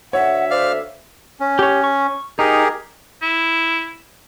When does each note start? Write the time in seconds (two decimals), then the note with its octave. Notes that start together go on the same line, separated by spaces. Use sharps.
0.13 D2 C#5 E5 F#5
0.51 C5 D5 F5 F6
1.40 C#4
1.59 G4 C#5
1.84 C#6
2.39 D#4 G4 G#4 A#4
3.23 E4